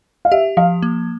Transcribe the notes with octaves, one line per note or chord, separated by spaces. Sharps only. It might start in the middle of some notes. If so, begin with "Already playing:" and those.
F5
G4 E5
F3 F5
A#3